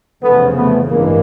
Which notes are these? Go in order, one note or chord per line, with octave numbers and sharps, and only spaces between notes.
F1 E2 C#3 F3 A3 B3
A3 B3
A1 G2 E3 G#3 A#3